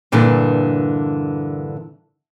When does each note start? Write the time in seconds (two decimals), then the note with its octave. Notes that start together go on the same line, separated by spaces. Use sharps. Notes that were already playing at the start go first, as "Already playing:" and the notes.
0.12 G2 A#2 D3 E3 D4 B4